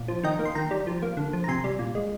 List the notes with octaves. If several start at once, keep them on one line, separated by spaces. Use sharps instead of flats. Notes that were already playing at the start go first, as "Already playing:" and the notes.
Already playing: A#2
F3
D#3 D#5 G5
A#3
C6
D#3 G5 A#5
G3
F3
A#3
D3
F3
A#5
C3 G#5 C6
G3
A#2
G#3